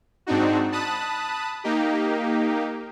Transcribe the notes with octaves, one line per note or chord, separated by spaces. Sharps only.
G#2 C4 D4 D#4 F#4
A5 B5 D#6 F#6
A#3 D#4 G4